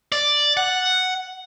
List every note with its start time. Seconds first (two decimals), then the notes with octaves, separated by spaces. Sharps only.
0.12 D5
0.57 F#5